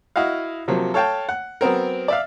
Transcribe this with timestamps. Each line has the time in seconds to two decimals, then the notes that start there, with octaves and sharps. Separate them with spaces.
0.16 E4 F#4 D#5 F5
0.68 C3 F3 F#3 A#3
0.94 A4 C#5 F5 G5 A5
1.29 F#5
1.61 F#3 B3 C4 A#4
2.08 D5 E5 F5